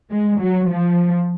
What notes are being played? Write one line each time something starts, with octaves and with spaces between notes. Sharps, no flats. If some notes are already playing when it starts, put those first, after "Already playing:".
G#3
F#3
F3